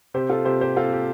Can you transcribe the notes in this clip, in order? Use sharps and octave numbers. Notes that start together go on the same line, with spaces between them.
C3 G4 C5
F4 A4
C3 G4 C5
G4 C5
C4 F4 A4
G4